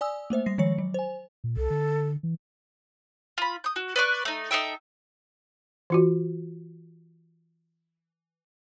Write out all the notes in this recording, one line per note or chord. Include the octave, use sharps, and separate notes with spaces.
D5 G#5 D#6 E6
A3 A#3 C5 E5
G3 A#6 C7
D#3 F3 G#3 C#5 C#7
F#3
C5 G#5
A#2
C2 A4
D3
E3
F4 B5
D#6 G6
F#4
B4 D5 C#6 F#6
A3 D#4
D#4 A4 E5 G5
E3 F4 F#4